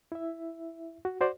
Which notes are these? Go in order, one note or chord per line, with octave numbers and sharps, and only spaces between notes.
E4 E5
F#4
F#4 C5 D5